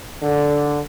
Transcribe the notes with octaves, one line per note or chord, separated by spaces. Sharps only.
D3